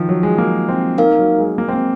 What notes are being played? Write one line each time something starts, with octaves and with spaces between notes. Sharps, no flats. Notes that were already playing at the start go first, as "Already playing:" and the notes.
Already playing: D#3 F3
F#3
G#3
A#3
C4
A#3 D#4 A#4 F5
F#3
G#3
A#3
C4
A#3